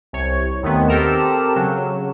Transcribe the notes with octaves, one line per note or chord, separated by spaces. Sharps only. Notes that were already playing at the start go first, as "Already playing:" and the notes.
C2 C#5
D#2 D#3 A3 B3 C4
C4 G4 A4 A#4 E7
C#3 F#3